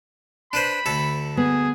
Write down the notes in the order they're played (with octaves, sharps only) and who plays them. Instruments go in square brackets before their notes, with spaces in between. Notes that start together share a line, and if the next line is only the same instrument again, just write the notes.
[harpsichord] D4 B4 C5 [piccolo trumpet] B5
[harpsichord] D2 A4
[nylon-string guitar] B3 [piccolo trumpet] G#4